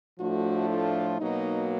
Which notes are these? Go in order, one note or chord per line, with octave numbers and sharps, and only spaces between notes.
A2 F3 A3 D4 F#4
F4
B2 F#3 A#3 D#4